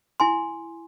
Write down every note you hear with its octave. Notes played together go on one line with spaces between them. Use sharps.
E4 G#5 C6